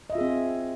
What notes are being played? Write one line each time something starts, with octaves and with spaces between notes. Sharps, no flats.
C4 F4 G#4 D#5 E5